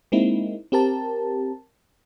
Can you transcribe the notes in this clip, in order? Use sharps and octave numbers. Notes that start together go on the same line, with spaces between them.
G#3 A#3 C4 D#4 E4
C4 G4 A#4 A5